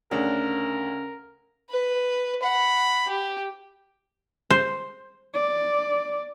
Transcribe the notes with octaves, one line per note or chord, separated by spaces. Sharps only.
D2 C#3 D4 A#4 F#5
B4
F#5 B5
G4
C5
D5